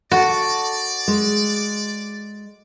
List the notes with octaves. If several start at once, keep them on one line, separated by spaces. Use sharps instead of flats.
F#4 A4 D5
G#3